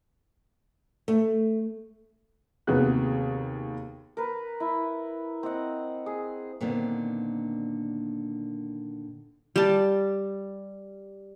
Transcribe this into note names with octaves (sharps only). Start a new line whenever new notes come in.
A3
D#2 C3 B3 F#4 G#4 F#6
A#4 B4
E4
C4 D#5 F#5
G#4
A#2 D3 D#3 B3 C4
G3 A5